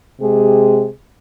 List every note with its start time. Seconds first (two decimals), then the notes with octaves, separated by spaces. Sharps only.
0.21 C3 G#3 G4 G#4